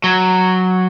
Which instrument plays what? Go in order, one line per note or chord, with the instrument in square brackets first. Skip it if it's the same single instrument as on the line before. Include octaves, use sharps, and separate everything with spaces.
[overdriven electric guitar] F#3